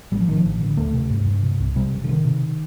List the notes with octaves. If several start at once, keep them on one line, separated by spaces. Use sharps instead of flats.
A1 G3
F3
A1 D#3
F3
A1
D3
D2 A3
C3
G2
G2
C3
C2
C3 G3
F1
D3
C3 D#3
C3